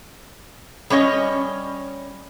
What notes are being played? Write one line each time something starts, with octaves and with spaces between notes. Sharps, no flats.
G3 C#4 C#5 D#5